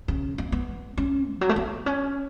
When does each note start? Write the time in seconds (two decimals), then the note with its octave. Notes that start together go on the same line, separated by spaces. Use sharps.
0.08 C#3
0.38 B3
0.52 B3
0.97 C#4
1.34 E3
1.41 F#3
1.49 A3
1.56 B3
1.86 C#4